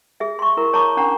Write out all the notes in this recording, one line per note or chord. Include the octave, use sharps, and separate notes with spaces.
G#4 E5
C6 C#6
E4 A#4
C#5 A5 A#5 C#6 D6
C#4 D4 F#5 A#5